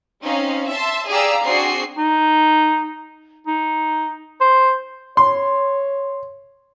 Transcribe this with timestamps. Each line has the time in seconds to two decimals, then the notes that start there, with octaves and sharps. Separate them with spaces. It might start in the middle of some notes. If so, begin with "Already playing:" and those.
0.23 C4 C#4 D#4 F5
0.69 E5 A5 C6
1.08 G4 G#4 D5 F5 A#5 E6
1.44 C4 D4 F#4 G#4 C7
1.98 D#4
3.47 D#4
4.41 C5
5.17 C#5 C6